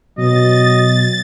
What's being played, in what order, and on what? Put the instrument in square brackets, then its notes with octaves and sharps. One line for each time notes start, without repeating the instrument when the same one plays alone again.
[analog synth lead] B2 [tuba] F#3 [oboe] D#5 [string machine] A6